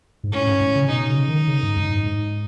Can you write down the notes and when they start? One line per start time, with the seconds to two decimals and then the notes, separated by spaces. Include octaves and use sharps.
0.24 G#2
0.32 A2 C#4
0.47 G#2
0.61 A2
0.76 C#3
0.90 B2 D#4
1.10 C#3
1.28 D#3
1.47 C#3
1.63 G#2
1.76 F#2
1.91 G#2
2.06 G#2